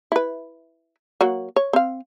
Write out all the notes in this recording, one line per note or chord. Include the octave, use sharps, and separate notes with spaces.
E4 B4
F#3 A#3 F#4
C#5
C4 F5